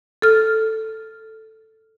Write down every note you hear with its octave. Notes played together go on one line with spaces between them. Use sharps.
A4 F6